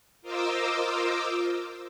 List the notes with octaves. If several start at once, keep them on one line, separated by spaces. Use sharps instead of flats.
F4 A#4 C5 D#5 D6 E6